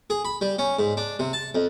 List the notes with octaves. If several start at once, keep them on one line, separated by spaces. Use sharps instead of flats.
G#4
B5
G3
C#4
G#2
D4
C3
A5
F2